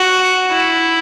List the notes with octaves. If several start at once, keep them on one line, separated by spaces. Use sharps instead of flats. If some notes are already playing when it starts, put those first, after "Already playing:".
Already playing: F#4
E4